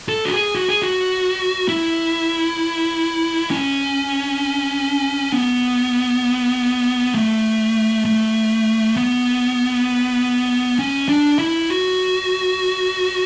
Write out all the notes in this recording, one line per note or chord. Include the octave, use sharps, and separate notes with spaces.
A4
F#4
G#4
F#4
G#4
F#4
E4
C#4
B3
A3
A3
B3
C#4
D4
E4
F#4